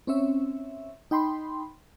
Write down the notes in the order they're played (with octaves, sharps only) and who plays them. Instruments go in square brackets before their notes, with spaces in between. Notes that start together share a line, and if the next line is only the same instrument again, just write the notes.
[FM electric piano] C4 C#4 C#5 E5
D#4 G5 B5 C6